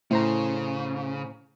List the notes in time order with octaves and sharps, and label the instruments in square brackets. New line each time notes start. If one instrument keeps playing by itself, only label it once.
[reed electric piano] A2 C5 A#5 [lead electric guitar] C#3